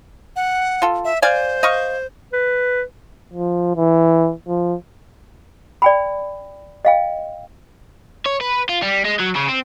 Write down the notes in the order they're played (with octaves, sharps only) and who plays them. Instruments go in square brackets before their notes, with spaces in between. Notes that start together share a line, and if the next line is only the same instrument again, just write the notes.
[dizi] F#5
[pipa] F4 A4
[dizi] E5
[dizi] C5 [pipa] D5 F5 G#5
[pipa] D#5 F5 C#6
[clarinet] B4
[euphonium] F3
E3
F3
[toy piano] D5 G5 B5
D#5 F5 G5
[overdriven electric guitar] C#5
B4
F4
G3
G#3
F#3
C#3
C4